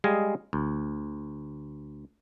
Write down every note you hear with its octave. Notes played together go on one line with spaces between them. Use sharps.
G3 G#3 G#4 D#5 F5 G#5
D2